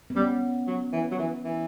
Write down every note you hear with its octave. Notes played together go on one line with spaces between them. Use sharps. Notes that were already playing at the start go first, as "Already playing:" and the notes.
B3
G3 C#4
F#3
E3
F#3
E3
E3